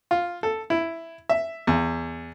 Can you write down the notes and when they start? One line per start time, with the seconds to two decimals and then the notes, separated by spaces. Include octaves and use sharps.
0.11 F4
0.43 A4
0.70 E4
1.29 E5
1.67 E2